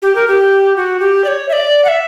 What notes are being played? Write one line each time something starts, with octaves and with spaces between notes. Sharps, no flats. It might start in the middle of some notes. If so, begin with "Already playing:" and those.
G4
A#4
G4
F#4
G4
D5
C#5
E5
D5
F#5
E5